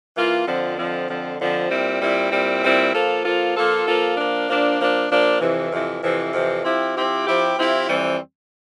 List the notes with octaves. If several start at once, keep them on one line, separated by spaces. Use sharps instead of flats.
E3 A#3 F4
F2 D3 F3 C4
F2 D3 F3 C4
F2 D3 F3 C4
F2 D3 F3 C4
A#2 G3 C4 E4
A#2 G3 C4 E4
A#2 G3 C4 E4
A#2 G3 C4 E4
F3 A#3 F4 A4
F3 A#3 F4 A4
F3 A#3 F4 A4
F3 A#3 F4 A4
F3 A#3 D4
F3 A#3 D4
F3 A#3 D4
F3 A#3 D4
F2 C3 E3
F2 C3 E3
F2 C3 E3
F2 C3 E3
F3 C4 E4 G4
F3 C4 E4 G4
F3 C4 E4 G4
F3 C4 E4 G4
F2 E3 G3 C4